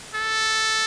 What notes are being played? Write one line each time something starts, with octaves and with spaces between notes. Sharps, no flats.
A4